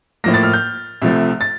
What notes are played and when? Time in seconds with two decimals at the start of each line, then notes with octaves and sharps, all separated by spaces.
0.24 A2 F3 A#3 A#6
0.34 A6
0.43 F6
0.53 G6
1.02 C2 C3 F3 A3
1.41 A6